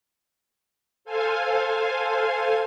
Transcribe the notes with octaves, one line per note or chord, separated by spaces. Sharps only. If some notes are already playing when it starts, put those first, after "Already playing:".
A4 C5 F5 G#5